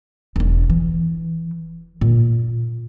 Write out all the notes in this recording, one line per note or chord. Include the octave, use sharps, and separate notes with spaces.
E1 D4
E3
A#2